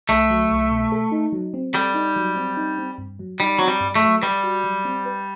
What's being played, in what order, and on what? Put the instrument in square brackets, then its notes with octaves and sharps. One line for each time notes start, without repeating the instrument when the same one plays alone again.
[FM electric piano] C2 [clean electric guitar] A3
[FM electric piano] F#3
C2
B2
A4
D#4
F#3
C4
[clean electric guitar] G3 [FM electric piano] A4
[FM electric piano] D#4
F#3
C4
D#4
C4
G2
F#3
[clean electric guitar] G3 [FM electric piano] D#4
[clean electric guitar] F#3 [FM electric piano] C4
[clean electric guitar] G3
[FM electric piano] G2
[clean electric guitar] A3
[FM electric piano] F#3
[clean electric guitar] G3 [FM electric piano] B4
[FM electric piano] F#4
F#3
C4
B4